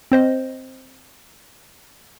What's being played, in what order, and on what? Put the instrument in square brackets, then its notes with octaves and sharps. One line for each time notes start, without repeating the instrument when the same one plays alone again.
[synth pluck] C4 C5 D#5